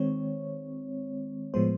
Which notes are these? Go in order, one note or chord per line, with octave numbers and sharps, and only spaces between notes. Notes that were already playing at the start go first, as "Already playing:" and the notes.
Already playing: D#3 G#3 C4 C#5
A2 F3 G#3 B3 C5